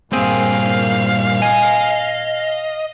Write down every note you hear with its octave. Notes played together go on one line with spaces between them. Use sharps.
G2 A#2 A#3 C4 G#4 F5
D#5 G#5